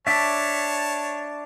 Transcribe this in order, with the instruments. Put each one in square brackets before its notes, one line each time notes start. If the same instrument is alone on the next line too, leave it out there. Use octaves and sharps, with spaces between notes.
[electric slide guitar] D4 E5 [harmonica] C#5 A5